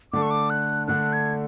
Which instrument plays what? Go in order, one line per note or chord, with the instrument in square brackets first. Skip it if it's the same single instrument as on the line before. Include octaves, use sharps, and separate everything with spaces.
[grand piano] D3 A3 D4 A4 [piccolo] D6
[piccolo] C#6
D6
F#6
[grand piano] D3 A3 D4 A4 [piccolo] F#6
[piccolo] G#6